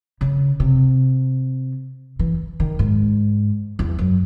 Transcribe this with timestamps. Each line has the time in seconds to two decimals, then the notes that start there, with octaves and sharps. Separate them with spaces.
0.21 C#3
0.60 C3
2.19 E3
2.60 D#3
2.79 G#2
3.79 E2
3.98 F#2